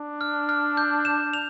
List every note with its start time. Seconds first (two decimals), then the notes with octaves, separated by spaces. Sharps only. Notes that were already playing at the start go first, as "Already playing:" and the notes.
Already playing: D4
0.21 F6
0.49 F6
0.77 G6
1.05 E7
1.33 F7